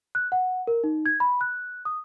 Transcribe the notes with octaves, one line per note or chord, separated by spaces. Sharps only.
F#6
F#5
A#4
D#4
G#6
B5
F#6
D#6